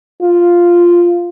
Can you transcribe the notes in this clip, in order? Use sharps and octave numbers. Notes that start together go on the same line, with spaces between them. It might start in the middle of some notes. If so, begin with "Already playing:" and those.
F4